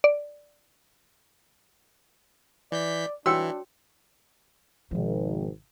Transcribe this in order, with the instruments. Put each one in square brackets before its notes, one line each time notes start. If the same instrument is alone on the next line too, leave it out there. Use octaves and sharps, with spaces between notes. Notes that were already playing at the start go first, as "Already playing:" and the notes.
[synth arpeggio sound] D5
[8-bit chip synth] E3 G6 B6 [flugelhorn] D5
[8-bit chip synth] E3 [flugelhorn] D4 [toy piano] F#4 C#5 G5 [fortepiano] E6
[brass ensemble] G#1 [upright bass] B2 F3